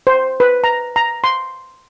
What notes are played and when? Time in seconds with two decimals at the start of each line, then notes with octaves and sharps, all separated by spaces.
0.07 C5
0.40 B4
0.64 A#5
0.96 A#5
1.24 C6